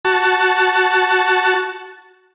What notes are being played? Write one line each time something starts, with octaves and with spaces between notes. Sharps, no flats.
F#4 A5